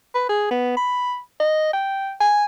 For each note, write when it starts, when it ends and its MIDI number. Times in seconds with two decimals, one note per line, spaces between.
0.15 0.27 71
0.29 0.47 68
0.51 0.72 59
0.77 1.19 83
1.40 1.71 75
1.73 2.13 79
2.21 2.45 80